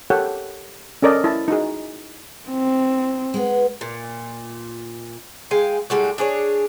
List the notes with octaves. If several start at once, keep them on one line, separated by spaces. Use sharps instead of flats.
G4 A4 A#4 C#5 F#5 G5
C#4 A4 A#4 D5 D#5
E4 A5
D#4 F#4 G#4
C4
G#3 B3
A#2
G#3 F5 G5 G#5
A2 G3 G#3 F#4
D4 G#4 C5 C#5